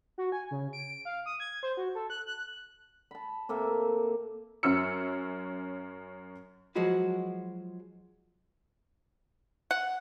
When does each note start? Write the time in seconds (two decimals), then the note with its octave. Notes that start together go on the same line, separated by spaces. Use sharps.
0.18 F#4
0.32 G#5
0.51 C#3
0.73 D7
1.05 F5
1.26 D#6
1.40 G#6
1.63 C5
1.77 F#4
1.95 A4
2.10 F#6
2.27 F#6
3.11 A5 B5
3.49 C3 A#3 A4 E5
4.63 F#2 C#4 E6 C#7
6.75 F3 F#3 G#3 F#4 B4
9.71 F#5